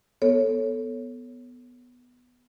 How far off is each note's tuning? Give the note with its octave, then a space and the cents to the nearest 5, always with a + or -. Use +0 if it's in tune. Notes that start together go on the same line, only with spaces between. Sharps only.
B3 +0 A4 +0 C#5 +0